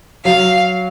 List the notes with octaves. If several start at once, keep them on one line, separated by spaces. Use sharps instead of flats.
F#3 F5